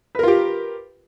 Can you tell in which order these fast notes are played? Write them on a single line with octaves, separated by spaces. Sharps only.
B4 A#4 F4 G4